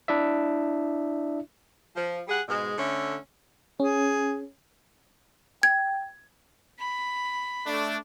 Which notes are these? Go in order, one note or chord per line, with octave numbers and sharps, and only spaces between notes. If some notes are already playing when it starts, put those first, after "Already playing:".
D4 E4 D5 E5
F3
G3 G#4 F#5
G#2 B2 G#3
D3 A3 C#4
C#4 G#4
G5 G#6
B5
A3 D4